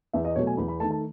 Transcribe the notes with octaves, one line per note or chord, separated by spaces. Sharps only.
E2 E5
D#5
B2 F#3 A3 C#5
G#5
E2 B5
B5
D#3 A3 A5
A5